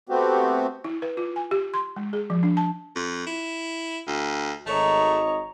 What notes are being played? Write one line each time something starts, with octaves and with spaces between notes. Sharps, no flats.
A3 B3 C4 F#4 G4
E4
B4
F4
G#5
G4
C6
G#3
G#4
F3
D4
A5
F2
E4
D2
G#1 A3 C#5 D#5 A#5